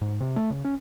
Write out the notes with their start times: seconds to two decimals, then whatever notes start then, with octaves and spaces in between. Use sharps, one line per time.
0.01 G#2
0.21 C3
0.36 A3
0.50 C#3
0.65 C#4